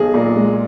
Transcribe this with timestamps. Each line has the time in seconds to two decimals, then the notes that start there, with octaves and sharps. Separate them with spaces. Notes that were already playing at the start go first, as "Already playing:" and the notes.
Already playing: B1 G#4
0.14 A#2
0.36 G#3